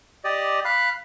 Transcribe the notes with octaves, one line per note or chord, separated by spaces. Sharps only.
G4 D5 D#5
F5 B5 F#6